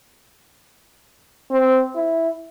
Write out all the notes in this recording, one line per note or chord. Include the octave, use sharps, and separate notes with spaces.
C4
E4